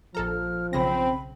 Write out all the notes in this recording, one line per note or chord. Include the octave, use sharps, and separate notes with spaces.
A#1 F3 A4 A#5 F6
B1 C#3 C4 B5 A#6